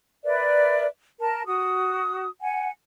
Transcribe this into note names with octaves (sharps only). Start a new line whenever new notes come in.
A#4 B4 D5 E5
A#4 A5
F#4 D#6
F#5 G#5